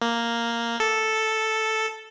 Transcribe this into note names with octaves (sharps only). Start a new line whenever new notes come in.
A#3
A4